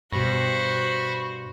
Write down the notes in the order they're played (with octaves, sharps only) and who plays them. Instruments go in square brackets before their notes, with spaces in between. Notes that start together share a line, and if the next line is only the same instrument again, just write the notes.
[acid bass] G2 [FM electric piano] B2 A#6 [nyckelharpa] F#4 C5 [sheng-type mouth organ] B5 C#6